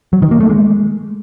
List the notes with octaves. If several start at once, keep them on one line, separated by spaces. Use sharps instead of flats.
F#3
D#3
A#3
A3
G#3